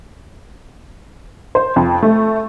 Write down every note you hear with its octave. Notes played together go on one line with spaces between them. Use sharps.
C5
F2
A3